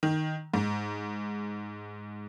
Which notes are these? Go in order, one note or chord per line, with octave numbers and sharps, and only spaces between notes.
D#3
G#2